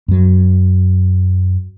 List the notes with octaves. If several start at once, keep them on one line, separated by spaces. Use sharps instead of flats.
F#2 F#3